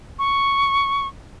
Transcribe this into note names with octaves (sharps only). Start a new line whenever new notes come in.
C#6